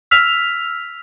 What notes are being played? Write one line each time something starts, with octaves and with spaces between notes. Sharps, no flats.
E6 F6 B6 F7